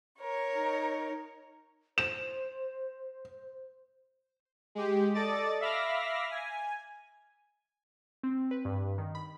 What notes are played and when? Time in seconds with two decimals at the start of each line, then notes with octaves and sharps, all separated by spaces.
0.20 A#4 C#5
0.55 D#4
1.98 C5 E7
4.75 G#3 G4
5.14 A4 D5 D#5 D6 A6
5.61 E5 F5 B5 D6 F6 A#6
6.31 G#5
8.23 C4
8.51 B4
8.65 G2
8.98 D#3
9.15 B5